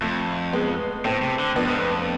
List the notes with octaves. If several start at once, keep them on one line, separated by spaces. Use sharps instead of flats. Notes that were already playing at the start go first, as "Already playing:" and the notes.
F2 A3
G#3 B3
A2 A3 C4
C3
D3
F2 B3 D4
G#2
F2